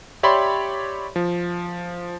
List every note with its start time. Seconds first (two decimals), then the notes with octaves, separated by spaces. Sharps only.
0.23 G4 C#5 D5 E5 B5 C6
1.16 F3